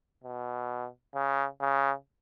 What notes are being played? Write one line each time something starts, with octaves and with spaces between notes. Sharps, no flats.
B2
C#3
C#3